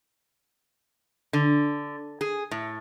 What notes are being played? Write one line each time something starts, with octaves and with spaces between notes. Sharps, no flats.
D3
G#4
A2